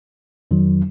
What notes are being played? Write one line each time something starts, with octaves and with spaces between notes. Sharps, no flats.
F2 D#3 F#3